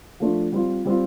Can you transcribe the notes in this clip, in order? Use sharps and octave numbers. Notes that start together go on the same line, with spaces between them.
F3 A3 D4 F4
G3 C4 F4
G3 C4 F4